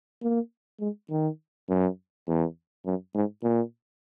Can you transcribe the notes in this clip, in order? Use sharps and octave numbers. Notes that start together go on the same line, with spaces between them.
A#3
G#3
D#3
F#2
E2
F#2
G#2
A#2